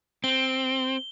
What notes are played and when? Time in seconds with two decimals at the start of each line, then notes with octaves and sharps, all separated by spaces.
0.24 C4 G7